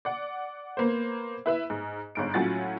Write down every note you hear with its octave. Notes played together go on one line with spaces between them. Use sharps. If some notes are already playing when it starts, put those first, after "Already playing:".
D5 F#5
A#3 B3 C5
E4 B4 E5
G#2
G1 G#2 D7
A2 F#3 C#4 F4 F#5 A6